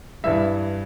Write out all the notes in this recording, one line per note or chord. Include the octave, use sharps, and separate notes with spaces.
G2 E3 G3 E5